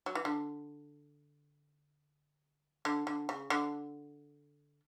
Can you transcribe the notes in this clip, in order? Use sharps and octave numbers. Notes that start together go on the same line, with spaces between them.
F#3
E3
D3
D3
D3
C#3
D3